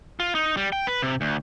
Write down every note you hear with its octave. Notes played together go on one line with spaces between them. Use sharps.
F4
D#4
G3
G5
B4
C3
D2